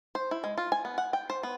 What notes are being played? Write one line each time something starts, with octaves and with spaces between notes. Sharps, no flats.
C5
E4
G#3
F4
G#5
B3
F#5
G5
C5
B3